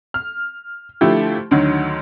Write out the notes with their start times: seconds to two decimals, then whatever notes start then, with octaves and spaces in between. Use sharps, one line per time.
0.14 F6
1.01 D3 F3 A3 E4 G4
1.51 D2 D3 D#3 F#3